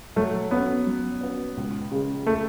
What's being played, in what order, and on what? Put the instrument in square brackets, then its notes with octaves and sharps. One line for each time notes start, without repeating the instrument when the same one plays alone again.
[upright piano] F#3 [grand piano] A3
[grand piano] B3 [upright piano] C#4 F#4 B4
[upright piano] F#3
C#4 F#4 B4
C#2
C#3 G#3
[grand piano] A3